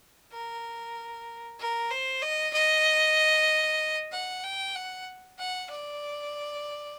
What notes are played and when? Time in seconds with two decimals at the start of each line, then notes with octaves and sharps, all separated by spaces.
0.32 A#4
1.59 A#4
1.91 C5
2.22 D#5
2.53 D#5
4.12 F#5
4.43 G5
4.75 F#5
5.38 F#5
5.70 D5